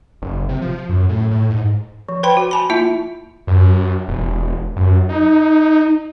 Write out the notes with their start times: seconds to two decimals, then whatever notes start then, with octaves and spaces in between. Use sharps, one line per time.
0.22 F#1
0.49 C3
0.62 F3
0.89 F#2
1.09 A2
1.31 A2
1.50 G#2
2.09 F3
2.23 B4 C5 G5 B5 C6
2.37 F#4
2.51 G#5 A5 B5
2.70 A#3 E4 F4 E5 A5
3.47 F#2
4.08 E1
4.76 F#2
5.09 D#4